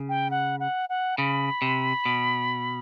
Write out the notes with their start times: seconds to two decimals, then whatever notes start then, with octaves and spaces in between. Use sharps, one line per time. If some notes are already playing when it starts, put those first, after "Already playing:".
Already playing: C#3
0.09 G5
0.31 F#5
0.60 F#5
0.89 F#5
1.18 C#3 B5
1.62 C3
2.05 B2